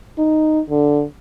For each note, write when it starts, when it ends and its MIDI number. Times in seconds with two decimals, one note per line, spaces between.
0.18 0.60 63
0.70 1.03 50